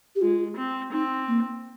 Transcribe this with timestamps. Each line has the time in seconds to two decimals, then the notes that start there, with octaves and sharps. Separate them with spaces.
0.16 G4
0.21 G#3 F4
0.57 C4
0.92 C4 D#4
1.28 A#3